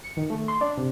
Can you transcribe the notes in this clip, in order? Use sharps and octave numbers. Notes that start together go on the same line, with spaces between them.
C#7
D#3
A3
C6
D4
C3